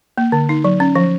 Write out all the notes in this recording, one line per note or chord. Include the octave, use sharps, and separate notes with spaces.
A#3
D3
D#4
F#3
C#4
F3